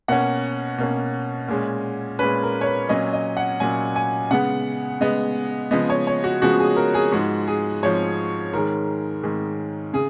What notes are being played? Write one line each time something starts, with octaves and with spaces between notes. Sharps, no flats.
B2 A#3 C#4 F#5
B2 A#3 C#4
A#2 G#3 C#4
A#2 G#3 C#4 B4
A#4
C#5
B4
A#2 F#3 C#4 D#5
D#5
F#5
A#2 F#3 C#4 G#5
G#5
C#3 G#3 B3 F#5
C#3 G#3 B3 D#5
C#3 F3 G#3 B3 D#5
C#5
C#5
F#4
C#3 F3 G#3 B3 F#4
G#4
A#4
G#4
G#2 F3 G#3 F#4
G#4
G#2 F3 G#3 C#5
G#2 D#3 G#3 A#4
G#2 D#3 G#3
C#3 G#4